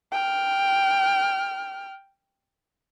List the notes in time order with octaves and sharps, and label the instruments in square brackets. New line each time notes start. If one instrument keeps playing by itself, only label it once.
[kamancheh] G5 F6